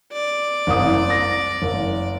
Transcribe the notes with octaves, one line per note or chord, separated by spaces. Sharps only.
D5
F#1 C2 D#6
A#6
F#1